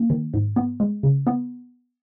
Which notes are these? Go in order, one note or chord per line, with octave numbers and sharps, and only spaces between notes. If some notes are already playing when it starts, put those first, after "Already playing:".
Already playing: A#3
D#3
G#2
B3
G#3
C#3
B3